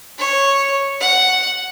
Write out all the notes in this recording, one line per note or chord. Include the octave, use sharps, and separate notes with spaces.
C#5
F#5